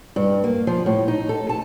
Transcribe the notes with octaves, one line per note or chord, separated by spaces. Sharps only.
G2
A#3
F3
A2
D#4
A4
A5